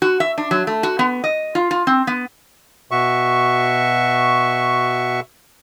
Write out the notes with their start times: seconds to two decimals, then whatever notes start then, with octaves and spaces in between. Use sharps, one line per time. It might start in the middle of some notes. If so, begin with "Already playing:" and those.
0.02 F#4
0.20 E5
0.38 D4
0.51 F#3
0.67 A3
0.83 F#4
0.99 B3
1.24 D#5
1.55 F4
1.71 F4
1.87 C4
2.07 B3
2.91 B2 F#4 E5 C#6